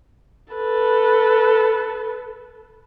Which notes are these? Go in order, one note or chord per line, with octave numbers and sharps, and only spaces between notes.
A4 B4